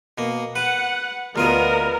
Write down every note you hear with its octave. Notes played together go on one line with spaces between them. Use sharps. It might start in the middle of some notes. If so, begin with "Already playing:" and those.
B2 A#3
B4 F#5
D2 B3 F4 A#4 D#5